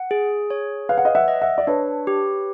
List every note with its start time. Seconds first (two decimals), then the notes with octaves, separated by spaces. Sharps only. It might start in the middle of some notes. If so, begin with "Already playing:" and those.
Already playing: F#5
0.11 G#4
0.50 C#5
0.89 B4 F5
0.98 F#5
1.05 D#5 F5
1.15 E5 F#5
1.28 D#5
1.41 E5 F#5
1.58 D5
1.67 D4 B4 C#5
2.07 G4